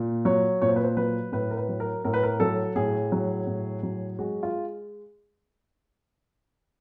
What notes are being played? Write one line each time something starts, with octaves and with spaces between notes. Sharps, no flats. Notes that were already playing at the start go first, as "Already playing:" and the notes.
Already playing: A#2
F#3 C#5
A#2 C#5
C5
B4
C5
F#3 B4
A2 B4
A#4
B4
F#3
A#4
A2 A#4
B4
A#4
F#3 A4
A2 G#4
F#3
A2
F#3
G#3 F#4
F4